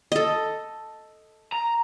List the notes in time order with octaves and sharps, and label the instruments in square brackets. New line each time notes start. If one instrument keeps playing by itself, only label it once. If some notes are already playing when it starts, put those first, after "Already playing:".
[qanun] A4 D#5
[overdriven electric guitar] A#5